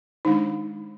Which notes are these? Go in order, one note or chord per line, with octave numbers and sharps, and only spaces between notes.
D#3 G#3 D4 D#4